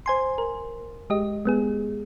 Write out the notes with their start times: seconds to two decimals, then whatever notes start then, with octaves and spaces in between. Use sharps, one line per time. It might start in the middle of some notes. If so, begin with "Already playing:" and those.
0.06 C5 G#5 C6
0.38 A#4
1.10 G#3 G4 D#5
1.45 G#3 B3 G#4